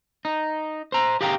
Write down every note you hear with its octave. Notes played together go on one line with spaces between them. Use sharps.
D#4
C5 A#5
G4 G#4 F5 G5 A#5